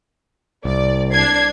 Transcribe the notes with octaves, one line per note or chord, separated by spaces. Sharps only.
C2 D5
D4 G#6 C7